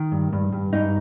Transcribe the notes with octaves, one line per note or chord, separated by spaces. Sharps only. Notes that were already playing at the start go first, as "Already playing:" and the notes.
Already playing: D#3
G2
G2
G2
G2 D#4